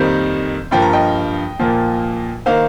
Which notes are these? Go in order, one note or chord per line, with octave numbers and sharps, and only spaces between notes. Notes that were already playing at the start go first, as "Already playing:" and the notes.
Already playing: F2 D#3 G3 A#3 C5
G2 F3 A#3 G5
A#5
D#5 G5
A#2 F3 A#3
D#3 A#3 C5 F5